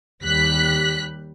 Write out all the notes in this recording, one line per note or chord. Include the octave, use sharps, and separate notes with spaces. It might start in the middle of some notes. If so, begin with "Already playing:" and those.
D#2 G3 F#6 B6